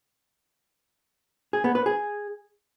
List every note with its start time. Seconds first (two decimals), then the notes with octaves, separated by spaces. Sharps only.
1.53 G#4
1.64 B3
1.75 B4
1.86 G#4